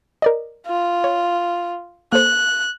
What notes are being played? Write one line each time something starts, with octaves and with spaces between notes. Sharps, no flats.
A#4 D5 D#5
F4
C#5
A#3 A4 C5 F#6